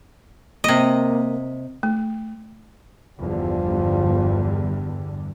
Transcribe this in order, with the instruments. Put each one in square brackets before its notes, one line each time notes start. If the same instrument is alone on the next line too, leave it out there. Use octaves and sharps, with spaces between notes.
[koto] C3 D#5 [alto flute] A#3
[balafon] A3
[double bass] G1 G3 [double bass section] E2 G2 D3 [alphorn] F3